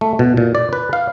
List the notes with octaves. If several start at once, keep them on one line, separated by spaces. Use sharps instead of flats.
A3
B2
A#2
D5
B4
F5